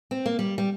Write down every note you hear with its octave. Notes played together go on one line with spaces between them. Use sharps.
C4
A#3
G3
G3